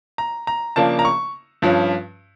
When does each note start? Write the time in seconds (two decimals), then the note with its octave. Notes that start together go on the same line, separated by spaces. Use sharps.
0.18 A#5
0.47 A#5
0.76 C#3 F3 A#3 D4 A5
0.99 A#5
1.05 C#6
1.62 G2 F3 C#4